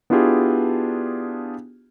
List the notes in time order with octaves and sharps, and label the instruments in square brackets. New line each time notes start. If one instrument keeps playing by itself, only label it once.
[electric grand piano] B3 D4 E4 F4 G4 G#4